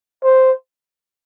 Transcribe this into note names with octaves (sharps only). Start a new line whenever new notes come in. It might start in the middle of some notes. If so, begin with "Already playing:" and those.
C5